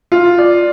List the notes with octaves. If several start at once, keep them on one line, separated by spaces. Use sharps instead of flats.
F4
D5